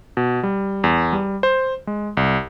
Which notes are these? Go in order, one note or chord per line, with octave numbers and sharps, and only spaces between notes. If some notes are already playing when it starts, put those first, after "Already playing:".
B2
G3
E2
G3
C5
G#3
C2